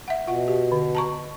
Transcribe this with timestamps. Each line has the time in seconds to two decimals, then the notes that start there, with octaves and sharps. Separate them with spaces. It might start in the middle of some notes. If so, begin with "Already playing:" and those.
0.08 E5 F#5
0.28 B2 F4 F#5
0.48 G4
0.72 D3
0.95 A5 A#5 C#6